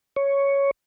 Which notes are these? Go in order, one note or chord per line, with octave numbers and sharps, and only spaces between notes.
C#5